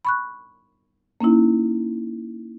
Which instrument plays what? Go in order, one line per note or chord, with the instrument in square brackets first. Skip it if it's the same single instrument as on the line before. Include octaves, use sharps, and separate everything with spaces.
[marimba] B5 C#6 F#6
A#3 C#4 D#4 E4